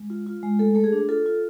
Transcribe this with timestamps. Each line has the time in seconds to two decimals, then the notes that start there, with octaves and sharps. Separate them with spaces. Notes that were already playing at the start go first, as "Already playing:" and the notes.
Already playing: G#3
0.10 F4
0.26 F4
0.43 G#3
0.59 A3 A4
0.75 A3 A4
0.84 G#4
0.92 D4
1.09 F4 A4
1.26 F4